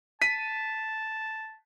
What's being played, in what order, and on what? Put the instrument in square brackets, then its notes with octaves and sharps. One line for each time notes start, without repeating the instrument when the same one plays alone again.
[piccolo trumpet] A5 [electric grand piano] B6 D#7